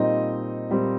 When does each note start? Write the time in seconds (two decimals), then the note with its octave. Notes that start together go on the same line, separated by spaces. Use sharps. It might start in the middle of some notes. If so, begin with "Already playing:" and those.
Already playing: A#2 G3 C4 D#4 D#5
0.69 A#2 G3 C4